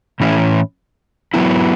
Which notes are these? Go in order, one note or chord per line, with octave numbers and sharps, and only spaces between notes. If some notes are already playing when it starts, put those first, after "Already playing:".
A2 E3 C#4 E4
F#3 B3 E4